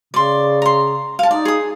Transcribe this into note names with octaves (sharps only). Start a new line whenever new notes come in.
C#3 D5 C6
A#5 C6
F5 A5
D#4 D5
G#4 D#6